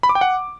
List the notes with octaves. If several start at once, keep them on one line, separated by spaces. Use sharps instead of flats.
B5
D6
G5
F#5